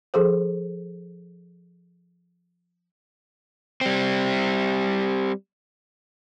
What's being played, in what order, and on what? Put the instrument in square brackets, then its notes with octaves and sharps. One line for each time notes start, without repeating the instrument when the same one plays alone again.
[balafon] F3 G#4 A4 C5
[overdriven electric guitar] G3 C4